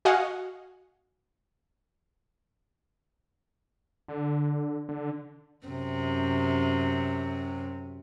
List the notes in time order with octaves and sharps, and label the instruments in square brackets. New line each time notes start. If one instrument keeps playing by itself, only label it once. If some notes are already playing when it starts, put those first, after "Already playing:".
[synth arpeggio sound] F#4 D#5 F5 F#5 G#5
[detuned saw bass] D3
D3
[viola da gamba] F#2 C3